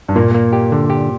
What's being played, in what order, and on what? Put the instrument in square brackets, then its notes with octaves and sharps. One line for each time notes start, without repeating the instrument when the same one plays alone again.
[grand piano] G2
[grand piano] A#2 [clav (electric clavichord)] A#3
[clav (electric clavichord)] A#3
G4
D3
G4